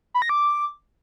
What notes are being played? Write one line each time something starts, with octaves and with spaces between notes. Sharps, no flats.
B5
A#6
D6